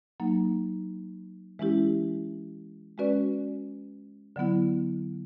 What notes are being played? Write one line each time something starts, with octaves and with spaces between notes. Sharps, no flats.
F#3 A#3 D#4
E3 G#3 C#4 E4 G4
G#3 C#4 F#4 B4 D5
D3 F#3 B3 E4